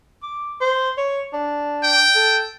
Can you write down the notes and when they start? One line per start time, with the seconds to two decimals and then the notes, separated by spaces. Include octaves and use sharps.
0.23 D6
0.61 C5
0.97 C#5
1.33 D4
1.83 G5
2.15 A4